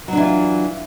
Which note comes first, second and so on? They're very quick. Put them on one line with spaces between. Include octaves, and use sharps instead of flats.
F#3 D4 E3 F4